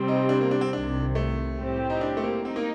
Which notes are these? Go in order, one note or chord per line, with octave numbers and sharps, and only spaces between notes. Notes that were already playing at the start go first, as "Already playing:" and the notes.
Already playing: C3 G3 C4
D#4
D4
A#3
D4
C4
C2 C3 D#3 D4
A3
A2 G3 C4 G4
D#4
D4
A3
A#3
C4 D#4
A#3